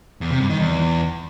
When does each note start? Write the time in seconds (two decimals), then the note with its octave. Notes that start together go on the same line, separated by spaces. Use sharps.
0.21 E2
0.31 C3
0.40 G2
0.50 D#3
0.59 E2